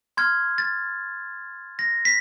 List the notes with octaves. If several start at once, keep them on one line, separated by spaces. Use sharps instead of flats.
C6 F6 G#6
A6
A#6
B6